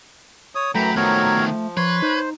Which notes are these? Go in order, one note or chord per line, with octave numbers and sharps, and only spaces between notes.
C#5 D#6
F#2 E3 F#3 A3 G5 A#5 B5
D#3 F3 F#3 B3 A#4 C#5
F3 B4 C#5 C6
D#4 C5